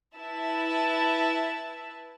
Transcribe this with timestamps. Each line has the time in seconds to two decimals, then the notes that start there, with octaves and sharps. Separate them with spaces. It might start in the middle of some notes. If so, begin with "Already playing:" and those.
0.15 E4 B4 E5 A5